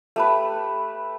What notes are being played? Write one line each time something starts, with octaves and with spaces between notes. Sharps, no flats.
A3 G4 B4